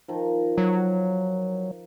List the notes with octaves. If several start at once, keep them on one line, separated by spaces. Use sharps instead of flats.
D#3 F3
F#3